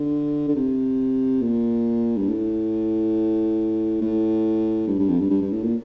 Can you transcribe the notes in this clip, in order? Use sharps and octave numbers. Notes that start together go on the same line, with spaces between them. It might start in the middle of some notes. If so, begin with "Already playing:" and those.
Already playing: D3
D3
C3
A#2
G2
A2
A2
G2
G2
F2
G2
G2
G2
A2
A#2